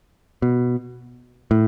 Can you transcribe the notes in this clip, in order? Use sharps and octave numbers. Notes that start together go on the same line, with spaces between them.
B2
A2